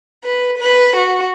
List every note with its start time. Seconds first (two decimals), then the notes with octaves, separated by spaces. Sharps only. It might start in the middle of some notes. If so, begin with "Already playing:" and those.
0.24 B4
0.58 B4
0.96 F#4